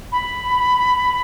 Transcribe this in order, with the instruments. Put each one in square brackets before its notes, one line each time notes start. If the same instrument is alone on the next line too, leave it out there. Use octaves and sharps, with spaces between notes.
[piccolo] B5